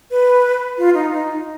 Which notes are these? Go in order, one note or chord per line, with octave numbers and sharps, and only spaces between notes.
B4
F4
D#4
D#4